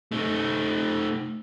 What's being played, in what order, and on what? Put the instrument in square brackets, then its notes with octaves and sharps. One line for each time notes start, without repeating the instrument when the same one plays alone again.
[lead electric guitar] A3 D#4